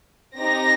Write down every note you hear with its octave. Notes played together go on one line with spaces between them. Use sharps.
C4 D#4 G4 A#6